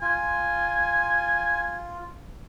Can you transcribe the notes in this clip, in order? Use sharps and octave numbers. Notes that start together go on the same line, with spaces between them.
F4 G#5